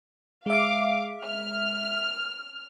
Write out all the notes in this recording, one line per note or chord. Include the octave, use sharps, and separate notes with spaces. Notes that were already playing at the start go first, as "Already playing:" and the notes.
G#3 E5 F5 D6
F6